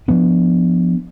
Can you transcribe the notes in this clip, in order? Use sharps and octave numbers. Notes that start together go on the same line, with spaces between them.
F3 B3 D4